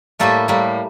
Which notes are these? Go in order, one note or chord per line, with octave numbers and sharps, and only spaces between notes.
A2 G3 A3 A#3 A4
A2 G3 A#3